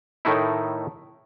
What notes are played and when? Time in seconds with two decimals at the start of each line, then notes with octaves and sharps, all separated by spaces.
0.25 A2 D#3 A3 D#4 E4